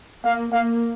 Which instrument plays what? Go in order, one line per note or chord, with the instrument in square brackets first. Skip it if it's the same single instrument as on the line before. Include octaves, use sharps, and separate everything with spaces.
[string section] A#3 [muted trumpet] F5
[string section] A#3 [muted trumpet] F5